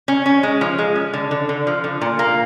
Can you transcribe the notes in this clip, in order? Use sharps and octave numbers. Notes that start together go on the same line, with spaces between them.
C#4
C#4
G#3
F3
G#3
C#4
D3
D3
D3
F3
D3
A#2
A#3